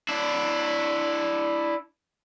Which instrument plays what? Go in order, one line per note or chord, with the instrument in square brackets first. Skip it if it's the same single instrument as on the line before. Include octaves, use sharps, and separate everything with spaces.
[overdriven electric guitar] D4 E4